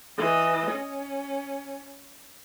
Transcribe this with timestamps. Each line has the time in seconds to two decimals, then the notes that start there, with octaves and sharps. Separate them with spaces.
0.18 E3 D#5
0.71 C#4